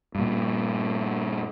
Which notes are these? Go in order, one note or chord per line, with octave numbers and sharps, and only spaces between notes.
G2 A#2